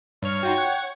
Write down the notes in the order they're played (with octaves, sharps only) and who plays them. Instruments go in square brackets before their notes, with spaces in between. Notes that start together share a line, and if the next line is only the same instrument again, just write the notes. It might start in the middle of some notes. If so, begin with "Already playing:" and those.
[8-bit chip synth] G2 F6 [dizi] C#5
[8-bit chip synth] D#4 F4 F#4 [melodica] G5
[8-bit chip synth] F#5 G#6